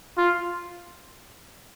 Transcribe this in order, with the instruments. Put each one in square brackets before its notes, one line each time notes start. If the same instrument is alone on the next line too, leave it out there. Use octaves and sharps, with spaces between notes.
[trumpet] F4